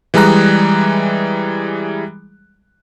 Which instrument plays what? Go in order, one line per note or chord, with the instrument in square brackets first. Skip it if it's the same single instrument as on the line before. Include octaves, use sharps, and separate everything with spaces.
[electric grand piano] E3 G3 G#3 G#4 A#5 F#6